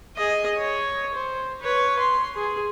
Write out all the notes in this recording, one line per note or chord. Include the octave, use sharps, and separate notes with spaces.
G#4 D#5
C#5
C5
B4 C#5
C6
G#4